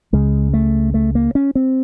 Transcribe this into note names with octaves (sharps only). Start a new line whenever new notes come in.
C#2 C#3 G#3
A3
A3
A#3
C#4
C4